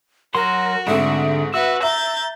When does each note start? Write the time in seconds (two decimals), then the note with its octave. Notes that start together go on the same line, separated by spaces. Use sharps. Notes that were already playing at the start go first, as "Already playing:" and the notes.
0.35 F#3 F#4 A#4 F#5 C6
0.87 G#2 D3 A3 C4 E5
1.54 F#4 B4 E5 E6
1.83 E5 A#5 G6 A6